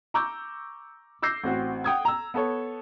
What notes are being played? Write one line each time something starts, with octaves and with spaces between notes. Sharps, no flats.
A#5 C#6 D6 E6 G6
D6 E6 G6 A#6 C7
A1 C4 F#4
F#5 G5 D#6 G#6
A#5 E6
B3 A4 C#5